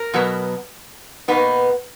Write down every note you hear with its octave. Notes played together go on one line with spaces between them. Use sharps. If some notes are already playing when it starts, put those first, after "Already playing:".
Already playing: A#4
B2 F#3 B3
B2 A#3 B3 D#4 B4